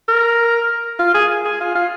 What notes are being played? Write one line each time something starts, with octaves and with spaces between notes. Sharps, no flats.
A#4
F4
G#4
G#4
F4
F4